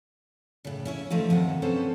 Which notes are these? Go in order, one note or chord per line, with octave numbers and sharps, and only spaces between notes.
A2 C#3
C#4 E4 C#5
E3 F3 A3 D#4
D#2 C3 D#3 F#5
C4 C#4 A4 B4 C5